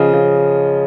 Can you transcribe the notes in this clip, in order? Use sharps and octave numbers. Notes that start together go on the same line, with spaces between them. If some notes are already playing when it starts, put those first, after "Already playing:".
Already playing: C#3 F3 D#5
C#3